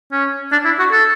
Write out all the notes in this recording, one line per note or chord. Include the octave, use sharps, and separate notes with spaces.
C#4
D4
E4
F#4
A4